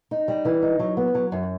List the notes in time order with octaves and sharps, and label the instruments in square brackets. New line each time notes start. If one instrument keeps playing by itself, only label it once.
[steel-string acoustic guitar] D#4
G3
E3
D#4
F#3
B3
F#3
F#2